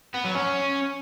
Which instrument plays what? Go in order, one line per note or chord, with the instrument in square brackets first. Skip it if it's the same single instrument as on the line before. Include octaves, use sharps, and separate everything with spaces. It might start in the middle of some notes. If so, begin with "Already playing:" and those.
[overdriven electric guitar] B3
F#3
C#4